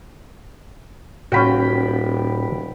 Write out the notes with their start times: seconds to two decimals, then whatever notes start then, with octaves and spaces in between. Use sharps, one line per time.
1.32 D#1 A2 C#4 F4 F#4 G5 B5